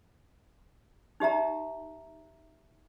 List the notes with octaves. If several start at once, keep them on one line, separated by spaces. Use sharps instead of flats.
D#4 G4 E5 A#5